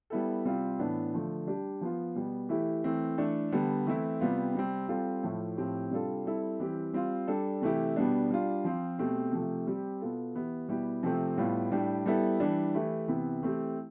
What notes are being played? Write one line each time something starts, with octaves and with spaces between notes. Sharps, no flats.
G3 B3 E4 A4
C3 G3 C4 F4
A2 E3 B3 D4
D3 F3 A3
G3 D4 G4
F3 B3 F4
B2 G3 B3
E3 A3 E4 G4
E3 A3 C4
E3 A3 D4 A4
D3 G3 B3
E3 A3 C4 E4
C3 G3 B3 F4
C3 G3 C4
G3 C4 F4 A4
A2 F3 A3 E4
A2 F3 C4 G4
C3 G3 D4 F4 A4
G3 C4 E4 A4
E3 G3 C4 G4
G3 C4 F4
G3 D4 A4
C3 E3 A3 E4 G4
B2 G3 B3 D4
G3 D4 F4
F3 C4 F4
B2 A3 C4 G4
C3 F3 A3
G3 C4 G4
B2 B3 F4 A4
E3 B3 E4 G4
B2 G3 B3 E4 G4
C3 F3 A3 C4
A2 G3 B3 F4
A2 G3 D4 G4
G3 B3 E4 A4
E3 G3 D4
E3 A3 E4 G4
C3 E3 B3
E3 A3 C4 E4 G4